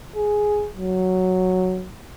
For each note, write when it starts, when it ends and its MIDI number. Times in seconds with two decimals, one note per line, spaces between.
0.17 0.68 68
0.78 1.87 54